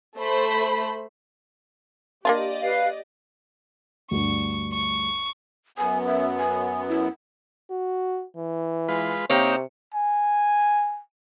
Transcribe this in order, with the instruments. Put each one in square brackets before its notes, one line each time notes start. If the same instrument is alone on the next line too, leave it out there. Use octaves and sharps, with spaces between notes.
[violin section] A3 C5 B5
[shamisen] A#3 D4 F4 [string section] G4 D5 D#5
[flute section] B4 F5
[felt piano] D2 G2 [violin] C#6
[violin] C#6
[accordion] F#2 B3 [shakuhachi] G#5
[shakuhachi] E5
G#5
E4
[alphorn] F#4
E3
[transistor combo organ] G#3 F4 B4
[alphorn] C3 [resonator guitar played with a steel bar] A#3 C4 C#5 [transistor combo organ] D#4 G4
[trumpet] G#5